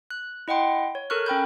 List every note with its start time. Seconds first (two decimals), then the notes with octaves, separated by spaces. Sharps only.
0.10 F#6
0.48 E4 D#5 F#5 G5 C6
0.95 C#5
1.10 A4 A#4 C#6 F6 F#6
1.26 C#4 G5 B5 G6